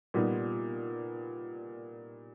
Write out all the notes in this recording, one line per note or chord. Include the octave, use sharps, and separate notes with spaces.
A#2 G3 B3 D#4